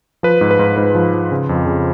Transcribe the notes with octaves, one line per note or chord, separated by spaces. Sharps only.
F3 B4
G#2
B4
G#2
G#2 B4
F3
F3
C#3
F2
C#3